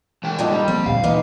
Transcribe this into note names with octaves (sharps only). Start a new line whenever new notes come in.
E3 G5
G2 A#2 D3 F3 D#4
G3
F3 A#3 C4
D2 A#2 F5
A#2 E3 B3 D#4